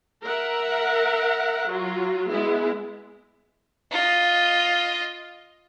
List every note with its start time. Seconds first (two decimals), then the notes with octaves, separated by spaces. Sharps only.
0.24 A#4 E5 F#5
1.68 F#3 F4 F#4
2.29 G#3 B3 E4 G#4
3.92 F4 D#5